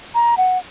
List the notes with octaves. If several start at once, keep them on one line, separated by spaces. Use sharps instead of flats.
A#5
F#5